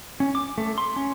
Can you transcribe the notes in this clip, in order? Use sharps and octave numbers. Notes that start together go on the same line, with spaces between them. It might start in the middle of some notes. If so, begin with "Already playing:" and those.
C#4
D6
A3
C6
C#4